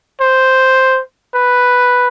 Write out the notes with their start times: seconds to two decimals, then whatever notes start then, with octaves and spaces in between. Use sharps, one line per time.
0.21 C5
1.34 B4